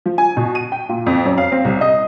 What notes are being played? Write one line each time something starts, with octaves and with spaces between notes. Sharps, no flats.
F3
G#5
B2
D#7
G5
A#2
F2
F#2
F5
C4
C2
D#5